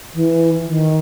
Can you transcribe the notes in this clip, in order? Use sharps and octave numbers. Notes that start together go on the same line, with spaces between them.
E3
D#3